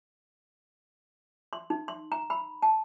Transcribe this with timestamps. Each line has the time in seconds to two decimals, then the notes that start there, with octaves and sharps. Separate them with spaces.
1.53 C6
1.70 D#4
1.88 C6
2.12 A#5
2.30 B5
2.62 A5